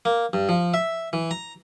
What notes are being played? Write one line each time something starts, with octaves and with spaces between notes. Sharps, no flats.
A#3
G2
F3
E5
E3
A#5